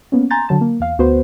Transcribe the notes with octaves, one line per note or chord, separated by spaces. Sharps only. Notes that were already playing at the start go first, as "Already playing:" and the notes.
A#3 B3 C#4
G#5 A#5 C6 G6 A6
D3 F#3 A5
A#3
E2 F5
D2 B3 F#4 B4 C5